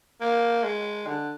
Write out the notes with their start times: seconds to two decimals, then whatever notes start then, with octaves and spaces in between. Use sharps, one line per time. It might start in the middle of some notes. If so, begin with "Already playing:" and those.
0.21 A#3
0.64 G#3
1.07 D3